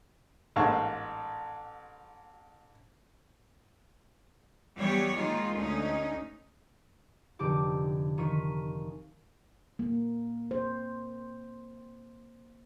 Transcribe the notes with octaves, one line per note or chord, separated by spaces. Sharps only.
A1 G#2 A#3 F5 A5 C#6
E3 F#3 G3 B3 G4 C#5
D#3 G#3 A#3 D#4 F4
D2 C#4 D#4
F1 D3 D#4 G4 D6
D#3 F4 C#6 B6 D#7
A#3
C5